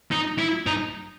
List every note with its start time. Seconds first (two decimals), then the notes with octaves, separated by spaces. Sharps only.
0.12 D#4
0.39 E4
0.67 D#4